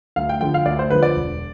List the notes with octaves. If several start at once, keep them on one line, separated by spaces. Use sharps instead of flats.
D2 F5
G5
D3 F3 G5
F5
D2 D5
C5
D3 F3 B4
D5
E1